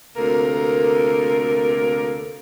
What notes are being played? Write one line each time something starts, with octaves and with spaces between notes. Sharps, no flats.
D2 C3 A#3 A4 A#4